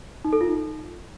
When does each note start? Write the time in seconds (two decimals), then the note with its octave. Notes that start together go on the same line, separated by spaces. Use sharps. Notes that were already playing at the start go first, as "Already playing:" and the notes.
0.25 D#4
0.33 A4
0.41 F4
0.49 D#4